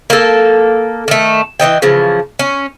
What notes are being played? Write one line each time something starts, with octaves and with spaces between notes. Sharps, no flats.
A#3 A4
D#3 A3
E3 F3 D#5 G5
C#3 E3 F3
C#4